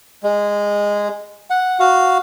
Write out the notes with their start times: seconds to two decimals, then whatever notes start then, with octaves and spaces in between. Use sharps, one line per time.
0.23 G#3
1.50 F#5
1.80 F#4 F5